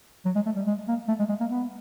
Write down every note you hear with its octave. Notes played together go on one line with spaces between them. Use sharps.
F#3
G#3
A3
G3
G#3
A#3
A3
G#3
G#3
A#3
B3